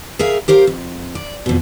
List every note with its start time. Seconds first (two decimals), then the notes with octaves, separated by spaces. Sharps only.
0.19 G#4 A#4 E5 F5
0.48 G4 A#4 C5 F5
0.67 F2
1.15 D5
1.46 F2 B2